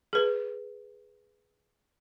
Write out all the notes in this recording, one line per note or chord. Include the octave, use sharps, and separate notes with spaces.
G#4 B4